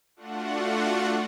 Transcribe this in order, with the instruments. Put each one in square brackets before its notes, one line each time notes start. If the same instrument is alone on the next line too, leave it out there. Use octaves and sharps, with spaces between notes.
[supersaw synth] A3 D4 F4 F#4 F#5